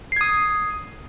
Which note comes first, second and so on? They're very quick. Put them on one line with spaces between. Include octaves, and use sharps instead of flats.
C7 G#6 D#6